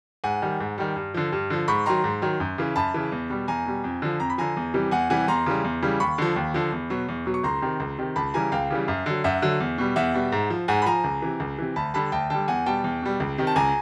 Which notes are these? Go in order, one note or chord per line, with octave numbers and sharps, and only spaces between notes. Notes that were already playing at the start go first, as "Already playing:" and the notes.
G#2 F#5 G#5
D#3 G3
G#2
D#3 G3
G2
D3 F3
G2
D3 F3
G#2 B5 C#6
D#3 F#3 A#5 C6
G#2
D#3 F#3
F#2
C#3 E3
F#2 A5 B5
C#3 E3
E2
B2 G3
E2 G#5 A#5
B2 G3
F2
D3 F3
F2 A#5
B5
D3 F3 G#5 A#5
E2
C3 E3 G3
E2 F#5 G#5
C3 E3 G3 F#5 G#5
E2 A#5 C6
C#3 E3 G3
E2
C#3 E3 G3
D#2 B5 C#6
D3 F3
D#2
D3 F3
E2
B2 F#3
E2
B2 F#3
C#6
C#2 A#5 C6
C3 D#3
C#2
C3 D#3
C#2 A5 B5
C#3 E3 G3 G#5 A#5
C#2 F5 G5
C#3 E3 G3
F#2
D3 F#3
F#2 E5 F#5
D3 F#3
E2
B2 G3
E2 E5 F#5
B2 G3
G#2
F3
G#2 F#5 G#5
B5
F3 G#5 A#5
C#2
C3 E3
C#2
C3 E3
D2 A5 B5
D3 G3 A5 B5
D2 G5 A5
D3 G3 G5 A5
E2 F#5 G#5
B2 G3 G5 A5
E2
B2 G3
C#2
C3 D#3
A5
C#2 G#5 A#5